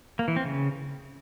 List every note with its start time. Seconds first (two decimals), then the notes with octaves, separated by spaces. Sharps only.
0.19 A#3
0.28 E3
0.36 C4
0.45 C#3